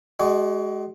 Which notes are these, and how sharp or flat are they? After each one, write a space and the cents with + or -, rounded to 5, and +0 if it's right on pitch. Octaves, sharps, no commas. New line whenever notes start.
G#3 +25 F#4 +40 D#5 -40